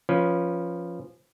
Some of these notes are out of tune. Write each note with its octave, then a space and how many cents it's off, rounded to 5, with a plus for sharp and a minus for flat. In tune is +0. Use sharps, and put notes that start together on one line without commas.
F3 +0 C#4 +0 B4 -10